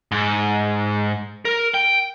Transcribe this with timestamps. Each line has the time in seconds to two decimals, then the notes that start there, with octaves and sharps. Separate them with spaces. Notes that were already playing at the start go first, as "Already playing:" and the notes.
0.12 G#2
1.45 A#4
1.74 G5